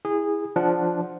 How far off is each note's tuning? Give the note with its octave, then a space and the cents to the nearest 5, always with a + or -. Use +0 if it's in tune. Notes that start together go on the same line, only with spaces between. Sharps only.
E4 -10 G#4 -20
F3 +0 D4 +0 F#5 +0